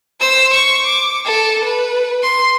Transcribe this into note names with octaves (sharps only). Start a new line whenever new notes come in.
C5 E6
C#6
D6
A4
B4
C6